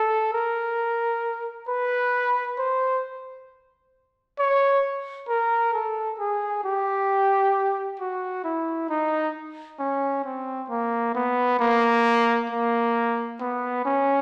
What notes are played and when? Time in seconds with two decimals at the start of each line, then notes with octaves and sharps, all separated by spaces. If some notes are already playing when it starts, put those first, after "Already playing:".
Already playing: A4
0.33 A#4
1.68 B4
2.58 C5
4.39 C#5
5.29 A#4
5.74 A4
6.19 G#4
6.64 G4
8.00 F#4
8.44 E4
8.89 D#4
9.80 C#4
10.24 C4
10.70 A#3
11.15 B3
11.60 A#3
12.50 A#3
13.40 B3
13.85 C#4